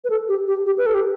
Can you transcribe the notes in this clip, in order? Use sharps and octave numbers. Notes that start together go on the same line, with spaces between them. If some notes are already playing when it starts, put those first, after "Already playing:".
B4
A4
G4
G4
G4
B4
A4
G4